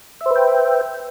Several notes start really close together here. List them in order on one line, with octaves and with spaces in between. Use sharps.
E5 C5 B4 G5